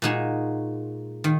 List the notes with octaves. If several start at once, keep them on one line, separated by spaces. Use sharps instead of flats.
A#2 G#3 D#4 F#4
D#3